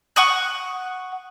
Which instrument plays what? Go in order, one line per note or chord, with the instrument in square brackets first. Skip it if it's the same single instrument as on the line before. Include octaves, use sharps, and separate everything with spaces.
[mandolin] F#5 C#6 D#6 F#6